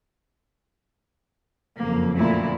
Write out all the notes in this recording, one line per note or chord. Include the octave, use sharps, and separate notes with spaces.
F#1 F2 A#3
D2 A#2 E4